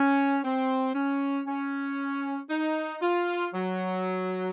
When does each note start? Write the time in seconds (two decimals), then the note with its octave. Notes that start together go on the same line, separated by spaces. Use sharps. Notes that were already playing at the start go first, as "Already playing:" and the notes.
Already playing: C#4
0.44 C4
0.95 C#4
1.47 C#4
2.50 D#4
3.02 F4
3.54 F#3